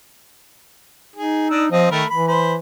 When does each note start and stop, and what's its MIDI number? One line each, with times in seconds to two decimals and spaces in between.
1.15 1.69 63
1.15 1.50 68
1.50 1.66 62
1.50 1.66 75
1.50 1.66 88
1.71 1.87 53
1.71 1.88 60
1.71 1.88 75
1.91 2.03 51
1.91 2.05 57
1.91 2.05 70
1.91 2.05 83
2.10 2.57 52
2.10 2.26 83
2.28 2.54 72
2.28 2.54 83